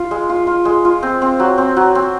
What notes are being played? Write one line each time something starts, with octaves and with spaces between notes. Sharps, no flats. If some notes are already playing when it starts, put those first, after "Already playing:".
Already playing: F4
G#3
F4
F4
G#3
F4
C4
C4
F#3
C4
F#3
C4